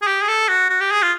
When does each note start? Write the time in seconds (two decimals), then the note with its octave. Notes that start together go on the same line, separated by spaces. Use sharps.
0.02 G#4
0.07 G4
0.22 G#4
0.28 A4
0.49 F#4
0.70 F#4
0.81 G4
0.91 G#4
1.02 F4